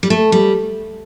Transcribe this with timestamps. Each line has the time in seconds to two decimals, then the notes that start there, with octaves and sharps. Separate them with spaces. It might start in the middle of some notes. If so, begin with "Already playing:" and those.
0.03 G3
0.10 A3
0.32 G3